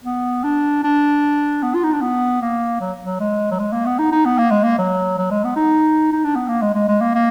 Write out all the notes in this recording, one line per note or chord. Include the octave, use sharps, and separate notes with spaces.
B3
D4
D4
B3
F4
D#4
D4
B3
A#3
F#3
F#3
G#3
F#3
G#3
A#3
B3
D#4
D#4
B3
A#3
G#3
A#3
F#3
F#3
G#3
B3
D#4
D#4
D4
B3
A#3
G#3
G#3
G#3
A#3
A#3